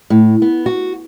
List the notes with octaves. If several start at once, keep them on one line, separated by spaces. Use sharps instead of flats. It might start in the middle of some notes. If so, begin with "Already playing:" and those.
A2
B3
F#4